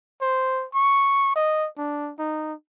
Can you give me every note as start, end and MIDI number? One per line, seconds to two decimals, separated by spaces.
0.22 0.65 72
0.75 1.34 85
1.36 1.68 75
1.78 2.12 62
2.19 2.53 63